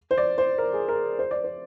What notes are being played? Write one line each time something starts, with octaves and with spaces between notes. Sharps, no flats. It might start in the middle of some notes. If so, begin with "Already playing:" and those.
C5
D5
C5
A#4
G#4
A#4
C5
D5
C5